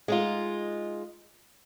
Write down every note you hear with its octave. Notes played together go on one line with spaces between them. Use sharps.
G#3 D#4 F4